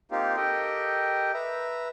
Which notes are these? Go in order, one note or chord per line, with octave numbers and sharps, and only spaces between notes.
A#3 C4 D#4 F4 G4
G4 A4 A#4 D#5 G5
B4 E5 A#5